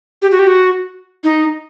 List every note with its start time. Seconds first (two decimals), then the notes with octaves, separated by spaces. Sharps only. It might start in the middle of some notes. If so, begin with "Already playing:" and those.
0.22 G4
0.31 F#4
0.39 G4
0.47 F#4
1.24 D#4